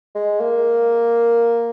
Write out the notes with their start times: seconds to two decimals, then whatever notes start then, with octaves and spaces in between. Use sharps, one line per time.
0.15 G#3
0.40 A#3